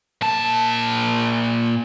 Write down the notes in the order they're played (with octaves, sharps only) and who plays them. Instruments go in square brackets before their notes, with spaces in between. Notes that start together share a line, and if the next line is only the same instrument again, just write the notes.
[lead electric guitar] A#2 A5